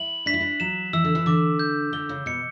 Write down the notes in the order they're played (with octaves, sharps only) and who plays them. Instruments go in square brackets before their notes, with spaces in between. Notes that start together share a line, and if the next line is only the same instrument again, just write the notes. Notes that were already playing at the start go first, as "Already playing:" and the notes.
Already playing: [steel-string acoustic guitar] E4 [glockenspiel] F#7
[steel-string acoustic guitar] D4 [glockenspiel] B6
[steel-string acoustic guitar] E4
D4
[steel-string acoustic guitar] F#3 [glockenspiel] E7
[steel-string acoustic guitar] E3 [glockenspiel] E6
[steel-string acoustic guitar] D3
E3
[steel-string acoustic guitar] D3 [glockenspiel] D6
[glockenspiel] G6
[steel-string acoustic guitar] D3 [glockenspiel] G7
[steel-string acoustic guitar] C#3
[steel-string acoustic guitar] B2 [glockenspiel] C#7